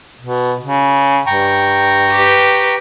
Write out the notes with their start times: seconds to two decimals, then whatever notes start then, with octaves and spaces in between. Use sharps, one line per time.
0.21 B2
0.62 C#3
1.26 G2 G5 A#5 C#6
2.11 G4 B4